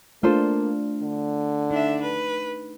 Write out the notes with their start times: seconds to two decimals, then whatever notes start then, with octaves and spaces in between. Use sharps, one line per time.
0.23 A3 A#3 D4 F4 A4 C5
1.03 D3
1.71 D4 D#4 E5
2.01 B4